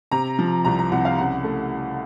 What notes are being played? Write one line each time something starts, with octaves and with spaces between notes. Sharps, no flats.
C3 A#5
F3
C2 A#5
A#5
C2 F#5
F5
C#3 F#5
A3